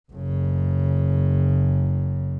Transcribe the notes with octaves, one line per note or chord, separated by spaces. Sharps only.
F#1 C#3